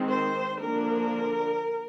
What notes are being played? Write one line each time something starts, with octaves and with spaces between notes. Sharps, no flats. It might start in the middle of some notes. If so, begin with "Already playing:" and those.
Already playing: D#3 G#3 C4
C5
D3 F3 A#3 D4 A#4